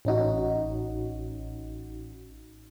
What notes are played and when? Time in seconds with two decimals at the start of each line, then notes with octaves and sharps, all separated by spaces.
0.05 A1 C#4 D#4 F#4